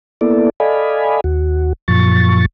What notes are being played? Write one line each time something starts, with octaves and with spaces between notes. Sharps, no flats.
A#3 B3 E4 A4 D5
A4 D5 D#5 F5 G#5 B5
D#2 F#4
F#2 A#2 F3 C#6 A6